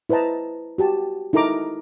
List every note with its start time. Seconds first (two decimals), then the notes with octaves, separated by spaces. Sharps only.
0.09 E4 B4 C5 D#5 A5 A#5
0.78 F#4 G4 A5
1.33 D#4 E4 A4 A#4 A#5 D6